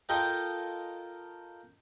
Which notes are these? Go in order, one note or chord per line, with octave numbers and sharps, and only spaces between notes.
F4 A4 A#4 D#5 G5